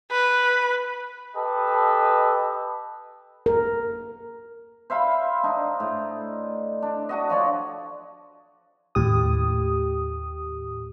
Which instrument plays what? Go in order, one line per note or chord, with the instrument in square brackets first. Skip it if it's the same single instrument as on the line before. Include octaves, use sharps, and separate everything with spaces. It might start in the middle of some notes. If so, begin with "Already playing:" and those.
[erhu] B4
[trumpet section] G4 A4 B4 D#5
[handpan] A#4
[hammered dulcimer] C5 E5 F5 B5
D4 D#4
A2
D4
D4 F#4 D#5
F3 C#5 D5
[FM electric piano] D#2 A2 G4 D#6